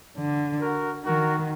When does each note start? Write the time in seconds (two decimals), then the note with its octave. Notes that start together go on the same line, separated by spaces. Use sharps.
0.17 D3
0.61 F#4 A#4
1.05 D#3 F#4 A#4